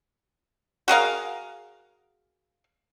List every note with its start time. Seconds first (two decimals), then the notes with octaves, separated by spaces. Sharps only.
0.88 F#4 G#4 A#4 F5